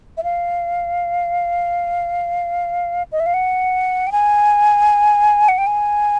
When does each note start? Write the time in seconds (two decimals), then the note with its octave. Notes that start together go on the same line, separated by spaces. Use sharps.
0.17 E5
0.24 F5
3.12 D#5
3.20 E5
3.26 F5
3.34 F#5
4.07 G5
4.12 G#5
5.49 F#5
5.58 G5
5.67 G#5